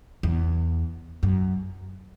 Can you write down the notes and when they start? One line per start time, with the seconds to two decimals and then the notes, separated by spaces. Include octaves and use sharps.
0.23 E2
1.23 F#2